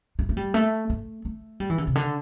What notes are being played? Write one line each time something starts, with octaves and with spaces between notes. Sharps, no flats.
A3
A3
G3
A3
A3
A3
G3
E3
D3
C3
D3